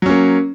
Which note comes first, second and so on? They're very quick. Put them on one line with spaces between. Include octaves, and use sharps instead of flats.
F#3 C#4 A#3